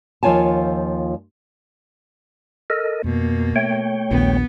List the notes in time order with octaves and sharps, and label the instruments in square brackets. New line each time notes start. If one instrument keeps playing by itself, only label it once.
[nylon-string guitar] D#2 F3 F4 C#5 G#5 A5
[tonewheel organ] A4 A#4 D#5
[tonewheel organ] F2 [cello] B2 A#3
[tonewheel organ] A3 C#5 G5
[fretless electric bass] A#1 D#2 [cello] B3